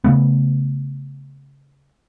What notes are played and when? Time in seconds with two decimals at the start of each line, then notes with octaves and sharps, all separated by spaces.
0.04 C#3 A3 B3